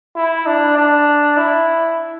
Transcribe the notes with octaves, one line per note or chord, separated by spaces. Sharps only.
E4
D4
D4
E4